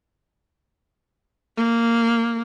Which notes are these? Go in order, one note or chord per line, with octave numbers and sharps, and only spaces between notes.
A#3